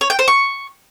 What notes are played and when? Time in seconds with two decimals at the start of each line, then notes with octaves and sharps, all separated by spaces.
0.01 C#5
0.10 G5
0.19 C5
0.28 C#6